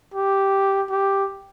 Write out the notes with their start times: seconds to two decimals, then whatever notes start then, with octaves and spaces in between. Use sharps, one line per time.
0.14 G4
0.90 G4